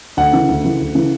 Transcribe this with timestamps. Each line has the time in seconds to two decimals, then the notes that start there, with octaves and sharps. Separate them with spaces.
0.17 D2 F#5
0.33 C#3 E3
0.49 D2
0.64 C#3 E3
0.80 D2
0.95 C#3 E3